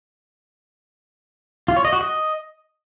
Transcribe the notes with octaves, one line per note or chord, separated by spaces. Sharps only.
F4
C#5
D#5
F#4
D#5